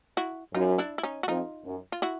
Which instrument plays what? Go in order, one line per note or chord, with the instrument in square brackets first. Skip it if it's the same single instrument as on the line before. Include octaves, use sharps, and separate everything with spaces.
[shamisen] E4 F#4
[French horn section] F#2 [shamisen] D#4 F4
[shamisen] D4 E4
E4
C#4 D#4
F#4
[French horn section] F2 [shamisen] D#4 F4
[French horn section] F#2
[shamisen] F4
E4 F#4